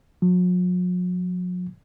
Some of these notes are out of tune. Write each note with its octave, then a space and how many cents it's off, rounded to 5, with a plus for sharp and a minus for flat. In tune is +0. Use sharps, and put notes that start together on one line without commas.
F#3 -45